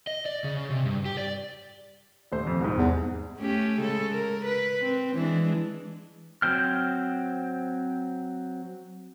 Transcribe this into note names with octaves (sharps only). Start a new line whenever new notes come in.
D#5
D5
C#3
C3
G2
G4
D5
D#1 A3 C5
F2
C2 G#2
E2
A3 C#4 G4
C#3 G#3 A4
A#4
B4
C4
E3 G#3 D4
F#3 C4 G5 F6